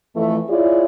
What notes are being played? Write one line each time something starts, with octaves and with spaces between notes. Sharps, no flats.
F2 E3 A3
E4 F4 G#4 C#5 D5